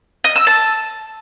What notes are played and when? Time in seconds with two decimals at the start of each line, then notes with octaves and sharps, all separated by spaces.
0.24 D#5
0.36 E6
0.47 A5